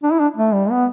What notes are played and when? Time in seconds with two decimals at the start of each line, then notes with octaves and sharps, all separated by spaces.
0.03 D4
0.12 E4
0.20 D4
0.37 A3
0.54 G3
0.71 B3